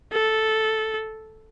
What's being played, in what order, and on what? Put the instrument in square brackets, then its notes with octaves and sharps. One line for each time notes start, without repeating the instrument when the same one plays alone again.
[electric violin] A4